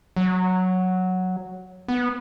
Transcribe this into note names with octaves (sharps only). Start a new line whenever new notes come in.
F#3
B3